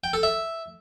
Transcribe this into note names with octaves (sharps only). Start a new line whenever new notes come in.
G5
A4
E5